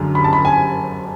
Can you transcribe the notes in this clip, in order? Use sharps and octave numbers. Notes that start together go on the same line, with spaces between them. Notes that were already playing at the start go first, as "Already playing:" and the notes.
Already playing: F#2 D3 G#3
B5
A5
B5
G#5